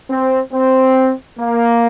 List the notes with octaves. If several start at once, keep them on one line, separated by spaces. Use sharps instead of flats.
C4
C4
A#3